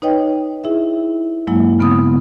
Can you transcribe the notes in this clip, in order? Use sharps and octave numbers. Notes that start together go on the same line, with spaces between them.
D#4 B4 C#5 D#5 G5
E4 G#4 E5
G2 F#3 G#3 A#3 E4
C#3 B3 C4 D#6